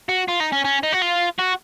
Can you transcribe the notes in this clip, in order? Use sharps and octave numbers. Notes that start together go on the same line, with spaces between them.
F#4
F4
D#4
C#4
C#4
D#4
F#4
F4
F#4